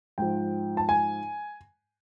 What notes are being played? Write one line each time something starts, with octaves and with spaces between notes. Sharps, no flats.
G#2 F3 G5
A5
G#5